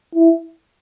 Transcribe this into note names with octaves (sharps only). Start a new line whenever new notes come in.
E4